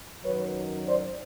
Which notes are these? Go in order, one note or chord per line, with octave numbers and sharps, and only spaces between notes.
F#2 D#3 F#3 B4 C#5
C5 D5